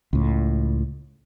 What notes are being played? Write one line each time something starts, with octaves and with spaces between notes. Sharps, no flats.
C#2 A2